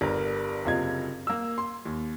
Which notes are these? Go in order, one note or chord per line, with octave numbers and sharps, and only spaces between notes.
G1 G2 A#4
F#1 C3 F4 D#5 G#6
A#3 E6
C6
D#2